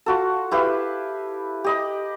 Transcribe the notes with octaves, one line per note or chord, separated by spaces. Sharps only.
F4 F#4 A4
E4 G4 B4 F5
G4 D#5 B5